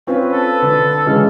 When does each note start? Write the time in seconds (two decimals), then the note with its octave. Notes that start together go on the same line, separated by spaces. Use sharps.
0.07 C4 C#4 F4 B4
0.33 A4
0.62 D3 D4
1.06 C#3 E3 G#3 F6